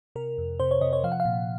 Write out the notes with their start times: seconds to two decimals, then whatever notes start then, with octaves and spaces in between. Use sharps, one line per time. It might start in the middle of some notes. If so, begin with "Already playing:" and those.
0.16 C3 A#4
0.38 F2
0.60 C3 C5
0.71 C#5
0.81 C3 D#5
0.93 C#5
1.04 F3 F5
1.12 F#5
1.20 F5
1.25 A#2